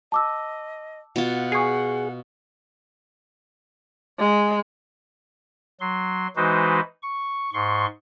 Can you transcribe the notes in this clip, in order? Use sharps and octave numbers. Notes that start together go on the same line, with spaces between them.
D#5 A5 D6 E6
B2 F4 F#5
G#4 C#6 C7
G#3
F#3 C6
E3 G#3 D#4 F#4 B4 C5
C#6
G#2 C6 C#6